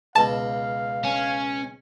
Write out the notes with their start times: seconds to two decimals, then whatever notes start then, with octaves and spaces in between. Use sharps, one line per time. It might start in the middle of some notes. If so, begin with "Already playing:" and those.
0.16 C#2 B2 F5 A5
1.04 C#4